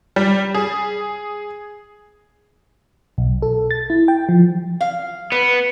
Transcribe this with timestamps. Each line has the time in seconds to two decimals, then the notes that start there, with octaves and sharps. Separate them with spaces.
0.16 G3
0.54 G#4
3.18 B1
3.42 A4
3.71 A6
3.90 E4
4.08 G5
4.29 F3
4.81 F5
5.32 B3 B4